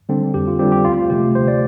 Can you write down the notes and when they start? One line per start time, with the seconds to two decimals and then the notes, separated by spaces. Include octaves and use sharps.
0.09 D3 G3 C4
0.34 F2 G4
0.47 F4
0.59 D3 G3 C4 G4
0.72 G4
0.85 D2 F4
1.10 C3 F3 A3 G4
1.35 D2 C5
1.48 D5